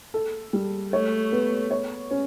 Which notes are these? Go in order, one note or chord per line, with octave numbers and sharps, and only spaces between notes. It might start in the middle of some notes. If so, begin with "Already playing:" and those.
A4
G3
A3 C#5
B3
C#5
C#4